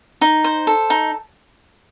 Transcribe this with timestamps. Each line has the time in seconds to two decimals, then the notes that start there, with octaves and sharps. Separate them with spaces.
0.21 D#4
0.44 C5
0.67 A4
0.90 D#4